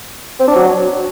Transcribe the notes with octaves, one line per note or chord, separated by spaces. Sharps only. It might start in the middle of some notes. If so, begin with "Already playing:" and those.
C4
D4
F#3